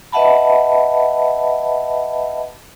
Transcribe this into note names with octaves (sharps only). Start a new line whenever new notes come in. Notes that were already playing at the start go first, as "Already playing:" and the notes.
B4 D#5 E5 F#5 A5 B5